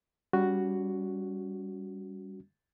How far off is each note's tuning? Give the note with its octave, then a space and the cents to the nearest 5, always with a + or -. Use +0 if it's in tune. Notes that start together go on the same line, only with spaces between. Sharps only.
G3 +0 C#4 +30 F#4 +0